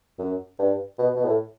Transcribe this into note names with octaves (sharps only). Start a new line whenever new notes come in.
F#2
G2
B2
B2
A2